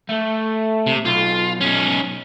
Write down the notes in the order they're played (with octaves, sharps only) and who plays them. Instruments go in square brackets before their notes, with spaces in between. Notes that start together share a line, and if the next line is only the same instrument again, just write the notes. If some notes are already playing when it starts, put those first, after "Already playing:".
[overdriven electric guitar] A3
[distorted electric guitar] C3
[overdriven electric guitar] B1 [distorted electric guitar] F4
[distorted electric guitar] C#4 D#4